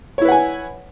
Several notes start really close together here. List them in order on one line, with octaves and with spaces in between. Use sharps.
C#5 E4 B4 F#5 G#5